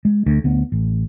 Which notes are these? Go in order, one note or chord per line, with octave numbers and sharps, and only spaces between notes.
G#3
D2
D2 B3
A1